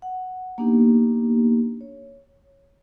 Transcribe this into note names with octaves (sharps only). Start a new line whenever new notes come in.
F#5
A#3 B3 D4 D#4 G4
C#5